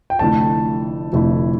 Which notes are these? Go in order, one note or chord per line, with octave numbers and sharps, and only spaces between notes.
G5
F1 F2 D3 A3 E4 A5
F1 F2 D3 A3 E4